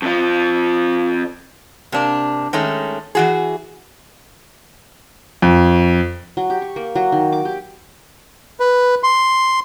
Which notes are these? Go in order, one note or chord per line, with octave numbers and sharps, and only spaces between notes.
F2 F3
C3 A#3 D4
D#3 G#3 A3 C#4
E3 F#4 G#4
F2
F#3
G4
C#6
A#3
F#3
D#3
D6
G4
B4
C6